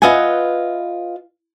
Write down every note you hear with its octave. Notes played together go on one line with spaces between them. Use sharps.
F4 B4 D#5 E5 F#5 G#5